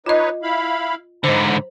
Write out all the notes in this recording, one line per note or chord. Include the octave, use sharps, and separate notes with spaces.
D#4 F4 B4 C#5 D#5
E4 F5 B5
G#2 D3 C5 A#5 B5